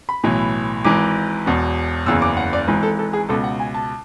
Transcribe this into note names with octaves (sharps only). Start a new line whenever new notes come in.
B5
B1 A2 E3
G#1 G#2 E3 D6
E1 E2 B2
F#1 E2 C#3 E3 E6
D6
F#5
D5
G#1 G#2 E3 B4
A4
A4
G#4
C#2 B2 A4
F#5
G#5
A5